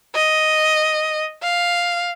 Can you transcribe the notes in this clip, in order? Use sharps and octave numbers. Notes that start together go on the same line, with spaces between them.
D#5
F5